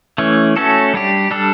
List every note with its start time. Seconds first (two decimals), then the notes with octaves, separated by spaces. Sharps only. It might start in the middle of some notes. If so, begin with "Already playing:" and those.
0.18 E3 A3 C#4
0.56 A3 C#4 F#4 A4
0.94 G3 D4 G4
1.31 G3 D4 A4